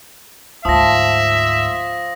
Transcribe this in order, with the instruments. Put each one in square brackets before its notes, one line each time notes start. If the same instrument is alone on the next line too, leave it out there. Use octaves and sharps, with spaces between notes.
[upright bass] D2 G#2 [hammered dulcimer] F3 [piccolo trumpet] E5 [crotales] D#6 A#6